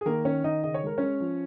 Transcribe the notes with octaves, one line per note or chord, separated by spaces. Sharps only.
G#4
D#3 A#3 A#4
D#3 C#4 C#5
D#3 D#4 D#5
C#3 D#5
C#5
G#3 A#4
G#3 C#4 C#5
F3